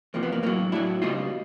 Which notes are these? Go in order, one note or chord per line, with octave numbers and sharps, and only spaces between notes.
E2 C3 F3 A#3
B3
A#3
A2 F#3 A#3
A2 F#3 D4 E4
C#2 B2 G3 D#4 F4